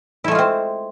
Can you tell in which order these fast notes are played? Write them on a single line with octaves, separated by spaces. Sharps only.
E4 A3 G#3 F4 C4